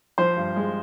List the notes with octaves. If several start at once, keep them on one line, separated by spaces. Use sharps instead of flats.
F3 C5
G2
G#3